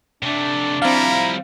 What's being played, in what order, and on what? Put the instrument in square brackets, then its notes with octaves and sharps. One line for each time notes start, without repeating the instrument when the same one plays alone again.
[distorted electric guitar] C3 A3 [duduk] D4
[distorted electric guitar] F3 G3 [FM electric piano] C4 F5 [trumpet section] E4 A#5